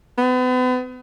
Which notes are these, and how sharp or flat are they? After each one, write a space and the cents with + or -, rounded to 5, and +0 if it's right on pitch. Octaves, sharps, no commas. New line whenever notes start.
B3 +40